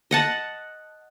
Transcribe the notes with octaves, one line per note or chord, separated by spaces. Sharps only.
D#5 F#5 A5